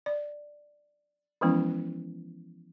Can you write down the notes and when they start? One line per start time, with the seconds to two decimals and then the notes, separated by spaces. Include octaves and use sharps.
0.06 D5
1.41 E3 F3 G#3 B3 C#4 E4